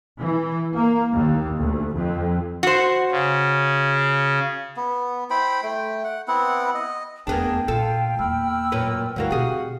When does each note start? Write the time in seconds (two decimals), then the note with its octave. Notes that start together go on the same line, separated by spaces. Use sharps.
0.19 E3
0.72 A#3
1.14 D#2
1.58 D2
1.92 F2
2.63 F#4 C5
3.11 C#3
4.77 B3
5.30 E4 C5 G5 B5
5.63 A3 G5
6.04 F#5
6.28 B3 C4 E4 F#5
6.75 D#5
7.27 F1 E2 A#3 B3 D4 G#4 G5 A5
7.68 A#2 F4 A4
8.19 E2 A#3 B5 E6 F6
8.72 F#2 A#2 B4
9.16 D2 G2 E3 F#4 A#4 F5 F#5
9.30 B2 G3 C4 G#4